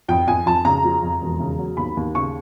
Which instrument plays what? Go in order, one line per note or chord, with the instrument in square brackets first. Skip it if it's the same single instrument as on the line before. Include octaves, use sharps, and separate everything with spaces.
[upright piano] F2 G5
F2 G#5
F2 A5
C#3 A#5
F3
F2
E1
C#3
F#3
D#2 B5
D#2
C#3 C#6